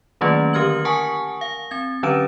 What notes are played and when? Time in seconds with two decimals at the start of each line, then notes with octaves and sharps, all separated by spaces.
0.21 D#3 F#3 A3 A#3 C#4 F4
0.53 D3 G4 A#4 F6 G#6 F#7
0.85 A#4 F#5 G#5 A5 C#6 D#6
1.41 F5
1.71 C4 G#6 A6
2.03 D3 F#3 C#4 D4 D7 E7